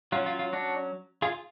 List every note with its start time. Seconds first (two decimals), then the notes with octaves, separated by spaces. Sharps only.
0.12 F#3 C#4 F4
0.26 F4
0.39 F4
0.53 D4 F#4
1.22 F4 G#4